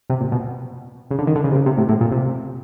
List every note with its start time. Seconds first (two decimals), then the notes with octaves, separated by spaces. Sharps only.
0.10 C3
0.21 A#2
0.32 B2
1.11 C#3
1.19 D3
1.27 D#3
1.36 D3
1.44 C#3
1.51 C3
1.55 C#3
1.66 C3
1.78 A2
1.89 A2
2.01 A#2
2.12 C3